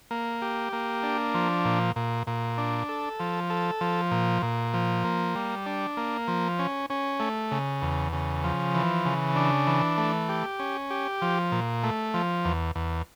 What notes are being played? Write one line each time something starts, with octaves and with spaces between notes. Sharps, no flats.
A#3
G4
A#3
D4
F3
A#2
A#2
A#2
D4
A4
F3
A4
F3
A#2
A#2
F3
A#3
G3
D4
A#3
F3
C#4
C#4
A3
C#3
E2
C#3
F3
E3
C#3
D4
E3
A3
G4
C#4
G4
F3
A#2
A3
F3
E2
E2